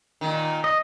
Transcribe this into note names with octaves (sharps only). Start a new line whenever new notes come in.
A#2 D#3
D#5